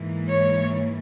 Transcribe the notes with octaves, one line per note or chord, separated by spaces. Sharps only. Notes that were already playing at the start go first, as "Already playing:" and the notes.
Already playing: G#2 E3 A#3
C#5